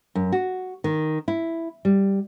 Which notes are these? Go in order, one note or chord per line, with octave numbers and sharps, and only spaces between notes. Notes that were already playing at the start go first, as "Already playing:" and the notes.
F#2
F#4
D#3
E4
G3